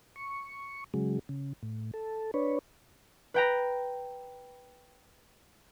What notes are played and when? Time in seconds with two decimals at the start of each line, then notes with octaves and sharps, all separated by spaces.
0.16 C#6
0.94 C#3 F#3 G#3
1.29 C#3
1.63 A2
1.94 A4
2.34 D4 B4 C#5
3.34 B4 G5 A#5